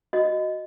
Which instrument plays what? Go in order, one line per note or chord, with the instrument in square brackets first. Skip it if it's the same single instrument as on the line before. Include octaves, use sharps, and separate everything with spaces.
[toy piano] F#4 D#5